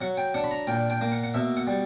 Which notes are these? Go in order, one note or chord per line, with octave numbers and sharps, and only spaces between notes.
F#3 F#5
G5
D4 F#5
B5
A#5
A#2 G5
G5
A#3
F#5
F#5
B2 E5
F#5
G3